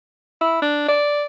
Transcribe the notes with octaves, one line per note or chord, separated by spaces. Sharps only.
E4
D4
D5